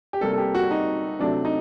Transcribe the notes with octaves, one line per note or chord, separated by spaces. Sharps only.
G4
C3 G3 A#3 A4
A4
G4
F#4
D#4
C3 F#3 A3 D4
D#4